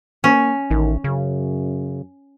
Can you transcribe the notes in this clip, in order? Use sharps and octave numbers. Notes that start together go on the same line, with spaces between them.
A#3 C#4
A1 D#3
F#2 C#3